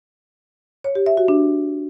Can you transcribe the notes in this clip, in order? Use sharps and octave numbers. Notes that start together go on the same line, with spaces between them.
C#5
G4
E5
F#4
D4